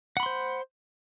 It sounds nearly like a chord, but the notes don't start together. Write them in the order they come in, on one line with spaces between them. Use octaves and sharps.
F#5 B5 C6 C5